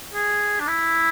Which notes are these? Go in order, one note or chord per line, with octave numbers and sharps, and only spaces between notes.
G#4
D4
E4